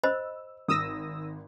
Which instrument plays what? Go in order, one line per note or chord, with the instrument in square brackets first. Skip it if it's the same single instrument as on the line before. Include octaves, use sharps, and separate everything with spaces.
[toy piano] C5 D#5 B5 [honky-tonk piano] E6
[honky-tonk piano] G#1 [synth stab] D#6 E6 A#6